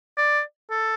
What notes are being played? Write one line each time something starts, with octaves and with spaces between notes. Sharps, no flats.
D5
A4